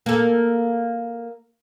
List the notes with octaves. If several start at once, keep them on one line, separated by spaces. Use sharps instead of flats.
A#3 A4